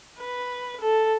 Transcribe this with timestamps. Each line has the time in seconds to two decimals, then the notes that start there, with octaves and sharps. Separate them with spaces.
0.19 B4
0.81 A4